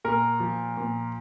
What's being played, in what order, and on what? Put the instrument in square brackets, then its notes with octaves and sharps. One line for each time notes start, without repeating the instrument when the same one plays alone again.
[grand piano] A#2 A#4
F3
A#2